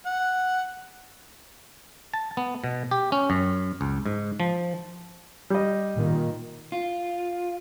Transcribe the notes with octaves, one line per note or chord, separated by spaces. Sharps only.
F#5
A5
B3
B2
G4
C#4
F#2
C#2
G#2
F3
G3 D#5
A#2 D#3
F4